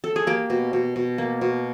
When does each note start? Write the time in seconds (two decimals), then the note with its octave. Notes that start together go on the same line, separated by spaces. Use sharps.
0.04 A4
0.16 G#4
0.27 A#3 G4
0.50 B2
0.73 B2
0.96 B2
1.18 A#3
1.41 B2